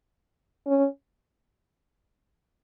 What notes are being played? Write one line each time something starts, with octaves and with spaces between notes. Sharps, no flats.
C#4